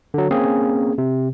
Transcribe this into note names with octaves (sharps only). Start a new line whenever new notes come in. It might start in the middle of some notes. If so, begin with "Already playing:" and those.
D3 F#3
A#3 C4 C#4 G#4
C3